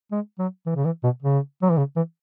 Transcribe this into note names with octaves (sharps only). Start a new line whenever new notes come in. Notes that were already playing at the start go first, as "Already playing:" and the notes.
G#3
F#3
E3
C#3
E3
B2
C#3
F#3
E3
C#3
E3